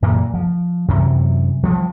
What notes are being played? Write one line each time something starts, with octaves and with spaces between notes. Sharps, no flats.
F#2 A#2 E3 A#3
F3
F#2 C3 E3 F#3
F3 G3 B3